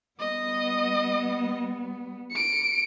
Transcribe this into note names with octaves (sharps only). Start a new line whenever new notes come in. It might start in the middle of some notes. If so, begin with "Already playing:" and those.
G3 B3 D#5
C#7 D7